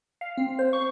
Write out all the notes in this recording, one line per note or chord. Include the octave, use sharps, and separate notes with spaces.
F5
C4
C5
C#6